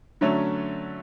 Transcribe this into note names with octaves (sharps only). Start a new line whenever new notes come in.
D3 F#3 A3 C#4